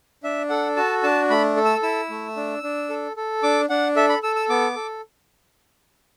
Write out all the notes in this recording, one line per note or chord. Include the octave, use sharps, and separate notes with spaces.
D4 E5
A4 F#5
F#4 A5
D4 A5
A3 B5
A4
E6
E4 E6
A3
D4
D4
A4
A4
D4 D6
D4 F#5
A4 E5
B5
A4 E6
E6
B3 D6
A4